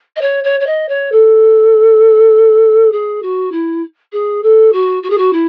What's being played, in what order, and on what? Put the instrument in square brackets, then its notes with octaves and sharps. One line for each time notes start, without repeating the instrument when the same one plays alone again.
[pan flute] D#5
C#5
C#5
C#5
D#5
C#5
A4
G#4
F#4
E4
G#4
A4
F#4
F#4
G#4
F#4
E4